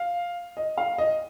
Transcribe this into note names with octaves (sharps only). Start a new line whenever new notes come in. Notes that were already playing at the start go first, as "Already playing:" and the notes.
Already playing: F5
D#5
F5
D#5